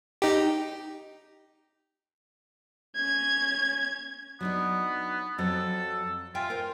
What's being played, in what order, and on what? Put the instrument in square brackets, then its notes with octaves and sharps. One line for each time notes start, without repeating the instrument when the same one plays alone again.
[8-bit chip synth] D#4 G4
[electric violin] C#4 G#6
[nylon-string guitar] F#3 D4 D#4 [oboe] B3
[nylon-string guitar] F2 F#3 [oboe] A4
[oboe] F4 [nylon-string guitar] E5 G5 G#5
[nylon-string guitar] A#4 C5